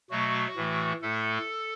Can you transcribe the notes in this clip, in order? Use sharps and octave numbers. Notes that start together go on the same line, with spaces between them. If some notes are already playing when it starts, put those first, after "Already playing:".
B2 F#3 A3 F#4
A2 E3 A3
A2 A3 A4